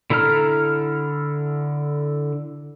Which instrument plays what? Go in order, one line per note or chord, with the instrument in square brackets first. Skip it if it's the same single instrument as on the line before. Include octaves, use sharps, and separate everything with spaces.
[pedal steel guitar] D3 E4 A4 A#5 F6